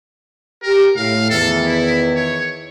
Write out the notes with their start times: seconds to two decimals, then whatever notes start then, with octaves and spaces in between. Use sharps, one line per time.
0.63 G4 A#4
0.96 A2 F5
1.30 E2 D#3 A4
1.66 E4
2.16 C#5